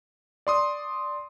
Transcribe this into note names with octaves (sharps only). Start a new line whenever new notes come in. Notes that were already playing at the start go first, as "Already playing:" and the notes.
D5 C6 D#6